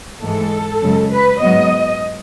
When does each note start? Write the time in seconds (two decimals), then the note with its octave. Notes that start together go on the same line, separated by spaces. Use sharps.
0.21 G#2 E3 G#3 A4
0.81 F#2 C#3 G#3
1.10 B4
1.40 G#2 F#3 B3 D#5